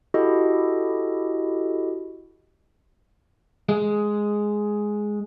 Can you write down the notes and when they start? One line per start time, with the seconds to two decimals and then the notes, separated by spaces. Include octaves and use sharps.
0.14 E4 F#4 G4 A4 D#5
3.69 G#3